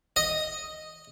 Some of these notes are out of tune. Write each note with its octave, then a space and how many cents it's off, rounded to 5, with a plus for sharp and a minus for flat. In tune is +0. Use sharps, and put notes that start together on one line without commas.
D#5 +0